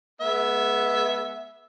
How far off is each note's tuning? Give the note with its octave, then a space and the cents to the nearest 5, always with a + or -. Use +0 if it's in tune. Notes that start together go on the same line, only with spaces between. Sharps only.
G#3 +30 B3 -10 E5 +0